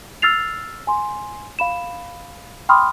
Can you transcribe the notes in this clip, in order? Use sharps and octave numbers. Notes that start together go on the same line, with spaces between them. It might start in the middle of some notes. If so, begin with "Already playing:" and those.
E6 F6 A6 C7 F7
G#5 C6
F5 B5 E7
G5 B5 C6 D6 D#6 F6